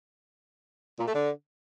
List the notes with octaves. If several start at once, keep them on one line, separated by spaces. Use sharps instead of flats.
A#2
A3
D3